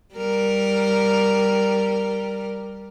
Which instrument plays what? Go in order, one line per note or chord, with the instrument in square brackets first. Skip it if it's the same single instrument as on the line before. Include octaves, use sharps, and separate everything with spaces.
[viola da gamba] G3 A#4